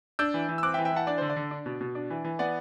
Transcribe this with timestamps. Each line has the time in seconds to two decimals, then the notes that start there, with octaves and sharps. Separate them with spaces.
0.19 D4 E6 G6
0.34 E3
0.49 E3
0.58 E6
0.63 C4 D6 F#6
0.74 E5 G5
0.78 E3
0.85 E5 G5
0.93 E3 F#5 A5
1.07 D4 D5
1.18 D3 C5
1.30 D5
1.36 D3
1.51 D4
1.66 B2
1.81 B2
1.95 D4
2.10 E3
2.24 E3
2.39 B3 D5 F#5